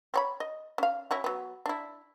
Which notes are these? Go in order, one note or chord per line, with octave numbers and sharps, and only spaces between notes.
C4 C#5 B5
D#5
C#4 F5
C#4 E4 F#4
F#3 B3
D4 E4